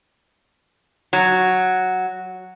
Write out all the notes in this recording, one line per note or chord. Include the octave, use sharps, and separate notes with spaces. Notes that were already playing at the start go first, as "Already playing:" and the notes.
F#3